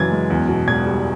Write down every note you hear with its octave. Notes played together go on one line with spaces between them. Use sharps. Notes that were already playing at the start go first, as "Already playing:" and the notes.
Already playing: F#2 C#3 E3 G#6 A6
G#3
E2
B2
E1 G#6
G3